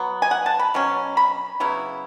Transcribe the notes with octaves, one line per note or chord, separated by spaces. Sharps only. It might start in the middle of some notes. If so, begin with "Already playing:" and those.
Already playing: F#3 B3
G#5
F#5
A5
B5
B2 F#3 C#4
B5
C#3 F#3 B3 E4